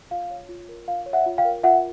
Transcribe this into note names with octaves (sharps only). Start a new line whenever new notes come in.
F4 F5
C#5
F4
A#4
F4 F5
C#5
E5 F#5
F4
F5 G5
A#4
F4 E5 F#5